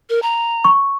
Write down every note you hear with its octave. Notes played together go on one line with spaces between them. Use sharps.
A#4
A#5
C#6